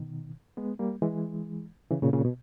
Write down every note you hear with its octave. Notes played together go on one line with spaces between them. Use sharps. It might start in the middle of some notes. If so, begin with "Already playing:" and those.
Already playing: B2 D#3
G#3 B3
G3 A#3
E3 G#3
C#3 E3
A#2 C#3
A#2 C#3
B2